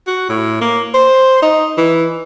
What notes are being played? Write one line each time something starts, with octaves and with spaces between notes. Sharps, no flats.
F#4
A2
A#3
C5
D#4
E3